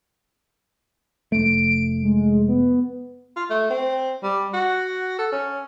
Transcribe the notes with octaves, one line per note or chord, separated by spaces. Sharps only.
F1 A3 D7
G#3
B3
F4
A3
C4
G3
F#4
A4
C#4